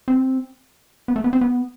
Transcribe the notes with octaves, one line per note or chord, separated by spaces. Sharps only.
C4
B3
A3
B3
C4
B3